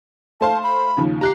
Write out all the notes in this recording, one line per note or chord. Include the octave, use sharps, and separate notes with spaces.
A3 C5 F5 A5
B5
D#2 C#3 F3
G4 A#5 F#6 C7